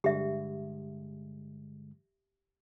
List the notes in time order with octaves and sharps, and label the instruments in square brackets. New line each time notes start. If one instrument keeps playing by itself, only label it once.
[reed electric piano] G2 D3 G#3 [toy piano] G4 E5